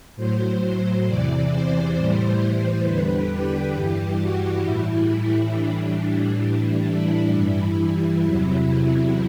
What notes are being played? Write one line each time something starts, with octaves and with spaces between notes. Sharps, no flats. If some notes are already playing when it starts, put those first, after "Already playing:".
A2 F#3 C5
E2 C3 E3 D5
C5
A2 E3 G3 C5
E2 D3 G3 B4
G4
G2 E3 G3
F#4
A2 E3 G3 E4
E4
A2 E3 G3 D4
A2 E3 G3
E4
G2 E3 G3
E2 C3 F#3
E4